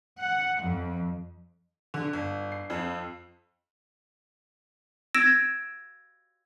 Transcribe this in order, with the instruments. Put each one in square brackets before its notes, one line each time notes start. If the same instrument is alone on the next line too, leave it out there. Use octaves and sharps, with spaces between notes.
[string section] F#5
F2
[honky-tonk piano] D3
G1
C7
F2
[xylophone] E6 G#6 A#6 D7 E7